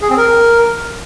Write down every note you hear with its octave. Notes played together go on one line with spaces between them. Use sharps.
G#4
C4
A#4